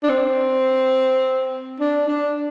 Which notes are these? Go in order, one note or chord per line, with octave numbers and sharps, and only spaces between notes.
D4
C4
D4
D4